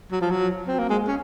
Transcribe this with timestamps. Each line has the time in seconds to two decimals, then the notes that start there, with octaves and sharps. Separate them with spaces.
0.12 F#3
0.21 F3
0.31 F#3
0.68 C4
0.79 A#3
0.89 G#3
1.08 C#4